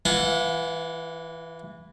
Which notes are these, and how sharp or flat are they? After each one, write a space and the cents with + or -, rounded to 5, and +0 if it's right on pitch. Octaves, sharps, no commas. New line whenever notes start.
E3 +0 F4 -40 F#5 -30